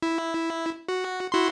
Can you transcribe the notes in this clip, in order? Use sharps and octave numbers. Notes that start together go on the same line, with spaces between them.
E4
F#4
E4 F#4 C6